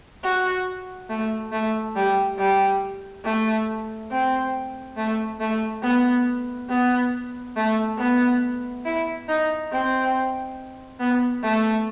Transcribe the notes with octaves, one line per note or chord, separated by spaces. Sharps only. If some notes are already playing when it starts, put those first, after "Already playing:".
F#4
A3
A3
G3
G3
A3
C4
A3
A3
B3
B3
A3
B3
E4
D#4
C4
B3
A3